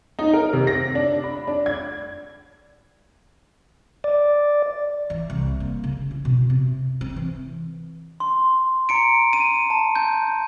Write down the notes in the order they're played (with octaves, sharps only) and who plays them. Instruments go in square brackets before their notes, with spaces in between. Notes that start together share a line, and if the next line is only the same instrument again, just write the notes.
[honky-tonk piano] D#4
A#4
C3
A#6
D4
B5
D4
G#6
[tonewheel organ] D5
[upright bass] E3
C2
A#3
C#3
E4
B2
C3
C4
E3
[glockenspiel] C6
A#5 C#7 D7
D#7
A5
G6